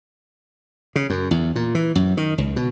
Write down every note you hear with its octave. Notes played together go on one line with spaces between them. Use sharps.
C#3
F#2
E2
A#2
E3
F#2
D#3
C#2
B2